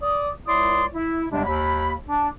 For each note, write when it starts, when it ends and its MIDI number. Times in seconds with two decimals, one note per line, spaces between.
0.01 0.28 74
0.01 0.28 87
0.46 0.84 37
0.46 0.84 64
0.46 0.84 73
0.46 0.84 74
0.46 0.84 84
0.46 0.84 87
0.93 1.25 64
1.31 1.42 40
1.31 1.42 48
1.31 1.42 55
1.31 1.42 56
1.31 1.42 62
1.45 1.93 39
1.45 1.93 83
2.06 2.28 62